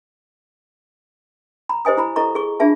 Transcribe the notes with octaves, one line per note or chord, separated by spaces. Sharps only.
A#5 B5
G4 C5 D#5 G#5 D#6
E4 A#5 B5
E4 A4 D#5 A#5 C#6
G#4 C#6
D4 F4 G#4 E5 A5